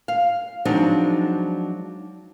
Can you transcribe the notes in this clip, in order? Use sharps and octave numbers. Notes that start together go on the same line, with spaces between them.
F5
F3 F#3 G#3 C4 D4 D#4